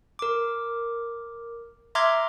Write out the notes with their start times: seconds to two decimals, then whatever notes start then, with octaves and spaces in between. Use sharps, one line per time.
0.19 A#4 D6
1.95 E5 A#5 C6 D6 F6 G#6